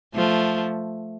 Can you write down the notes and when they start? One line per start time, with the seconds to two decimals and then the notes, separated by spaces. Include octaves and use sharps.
0.14 F3 A3